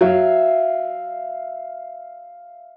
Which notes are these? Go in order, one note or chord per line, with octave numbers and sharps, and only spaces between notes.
F#3 E5 F5